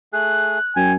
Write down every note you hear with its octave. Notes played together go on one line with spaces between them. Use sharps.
A3 G#4 F#6
F#2 G5 G#5